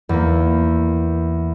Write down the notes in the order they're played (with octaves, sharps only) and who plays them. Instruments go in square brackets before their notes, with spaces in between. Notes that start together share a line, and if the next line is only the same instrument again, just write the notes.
[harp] E2 A#3